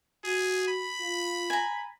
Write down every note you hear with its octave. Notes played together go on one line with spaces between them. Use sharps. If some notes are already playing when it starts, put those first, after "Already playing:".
F#4 G#4
B5
F4
G#5 A#5